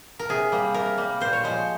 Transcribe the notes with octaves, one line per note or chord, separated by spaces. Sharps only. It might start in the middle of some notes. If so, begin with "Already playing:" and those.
A#4
C3 G#4
G3 A#3
C3 A#4
G3 A#3
A#2 C5
C#5
F3 G#3 C5